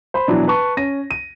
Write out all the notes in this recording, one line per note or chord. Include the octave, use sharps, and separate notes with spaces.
C5 B5
B2 E3 F#3 D4
B4 A5 C#6
C#4 A#6 D#7
D#7